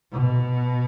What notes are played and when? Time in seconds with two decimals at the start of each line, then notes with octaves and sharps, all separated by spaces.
0.12 B2